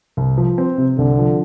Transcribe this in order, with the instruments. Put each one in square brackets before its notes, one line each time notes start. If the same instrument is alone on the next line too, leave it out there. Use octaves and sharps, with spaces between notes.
[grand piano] C2
F3
C4
C3
[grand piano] C2 [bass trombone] D3
[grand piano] F3